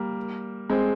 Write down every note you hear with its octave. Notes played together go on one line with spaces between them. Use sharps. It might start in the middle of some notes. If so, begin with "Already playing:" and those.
Already playing: G3 A#3
G#3 C4